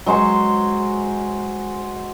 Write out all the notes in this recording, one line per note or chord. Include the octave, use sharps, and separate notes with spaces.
F#3 G#3 C5 C#6